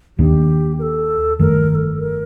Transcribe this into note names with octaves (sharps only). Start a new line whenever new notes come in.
D#2 D#3 A#3 D4 G4
A#4
A4
G1 F2 D#3 A3 A#4
A#4
A4
A#4